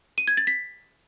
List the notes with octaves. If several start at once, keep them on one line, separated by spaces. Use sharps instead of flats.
D#7
G#6
A6
B6